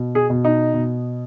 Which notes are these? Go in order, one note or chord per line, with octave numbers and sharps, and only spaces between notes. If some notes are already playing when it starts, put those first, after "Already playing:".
Already playing: B2
G#4
B2
D#4
B2